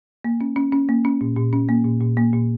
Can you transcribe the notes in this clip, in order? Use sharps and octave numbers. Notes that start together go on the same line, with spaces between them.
A#3
C#4
C#4
C#4
A#3
C#4
A#2
A#2
C#4
A#3
A#2
A#2
A#3
A#2